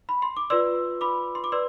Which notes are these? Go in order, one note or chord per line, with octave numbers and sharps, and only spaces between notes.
B5
C6
D6
F4 B4 D5 C6 E6
B5 D6
C6
D6
B4 D5 C6 E6